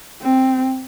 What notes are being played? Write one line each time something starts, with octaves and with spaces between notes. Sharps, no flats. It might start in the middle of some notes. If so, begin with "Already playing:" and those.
C4